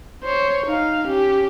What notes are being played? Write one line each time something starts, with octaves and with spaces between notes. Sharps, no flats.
C5 C#5
D#4 F5
C#4 G4